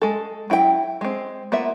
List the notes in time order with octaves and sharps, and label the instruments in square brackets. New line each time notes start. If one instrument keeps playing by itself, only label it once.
[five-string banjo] G#3 A4
F#3 E4 F#4 G5
G#3 C4
A#3 B3 F4 E5